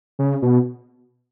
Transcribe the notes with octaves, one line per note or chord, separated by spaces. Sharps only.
C#3
B2